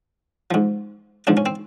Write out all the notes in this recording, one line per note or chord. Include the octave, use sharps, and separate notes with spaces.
G#2 F3
G#2 F3 D4
C#4
C4